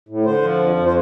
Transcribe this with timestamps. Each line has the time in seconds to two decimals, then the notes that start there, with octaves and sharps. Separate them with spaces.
0.09 A2
0.25 D3 C5
0.42 F3
0.59 F2
0.76 F2
0.86 C5